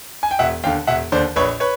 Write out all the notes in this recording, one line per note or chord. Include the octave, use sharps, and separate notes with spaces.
G#5
G5
E1 E5 F#5
D#2 D3 F5 G5
E1 E5 F#5
D#2 D3 C5 D5
A#1 B4 C#5
B4 C#5